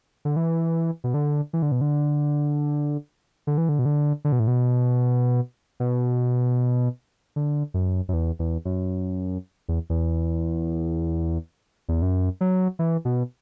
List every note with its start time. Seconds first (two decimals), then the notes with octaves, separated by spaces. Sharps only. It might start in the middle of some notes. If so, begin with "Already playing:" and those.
0.25 D3
0.36 E3
1.04 B2
1.14 D3
1.53 E3
1.62 D3
1.72 B2
1.81 D3
3.47 D3
3.58 E3
3.69 D3
3.79 B2
3.86 D3
4.25 D3
4.32 B2
4.39 A2
4.47 B2
5.80 B2
7.36 D3
7.74 F#2
8.09 F#2
8.13 E2
8.39 E2
8.65 F#2
9.68 E2
9.90 E2
11.88 E2
12.02 F#2
12.41 F#3
12.79 E3
13.05 B2